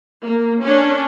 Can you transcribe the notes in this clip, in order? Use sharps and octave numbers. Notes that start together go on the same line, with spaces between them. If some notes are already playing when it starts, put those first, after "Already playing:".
A#3
C#4 D4